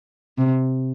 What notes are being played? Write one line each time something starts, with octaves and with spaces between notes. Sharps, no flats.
C3